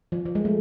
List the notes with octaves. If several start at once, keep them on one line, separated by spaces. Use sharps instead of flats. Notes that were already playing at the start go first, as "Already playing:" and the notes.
F3
F3
G#3
A3